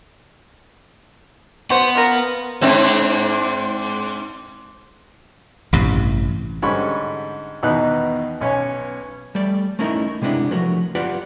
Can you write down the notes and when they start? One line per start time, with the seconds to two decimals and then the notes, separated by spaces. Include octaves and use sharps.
1.70 B3 F#4 C5
1.95 F4 A#4
2.61 G#2 C4 D4
5.73 A1 G2 C3
6.62 G#2 D3 G3 C#4 B5 C#6
7.63 E2 B2 D#3 B3 D#4 F#6
8.41 B1 C#4 B4 C#5 G#5
9.35 G3 A3 D5
9.79 A3 C#4 D#4 E4 A#4
10.22 C3 G#3 B3 D4 E4
10.51 F3 F#3 A3 F#4 A#4
10.95 F4 G4 B4 D5 F5 F#5